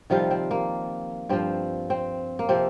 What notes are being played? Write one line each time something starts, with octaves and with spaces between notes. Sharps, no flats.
C3 D#3 F3 G3 F4
C4
A#3
G2 F3 C4
C4
A#3
C3 F3 C4